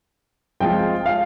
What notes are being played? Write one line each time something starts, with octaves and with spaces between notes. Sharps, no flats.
F3 G#3 C4 F4 G5
F5